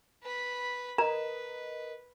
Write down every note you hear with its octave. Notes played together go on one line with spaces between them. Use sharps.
B4 B5
A#4 B4 D#5 A#5